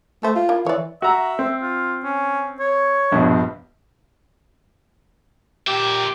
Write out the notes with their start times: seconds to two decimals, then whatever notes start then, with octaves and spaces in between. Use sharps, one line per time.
0.23 A3 A4 C5
0.35 F4
0.49 A#3 E4
0.66 E3 C#5 D5
1.02 F#4 E5 A#5
1.39 C4
1.62 F4
2.04 C#4
2.60 C#5
3.12 A#1 G2 B2
5.67 A#2 G4 E5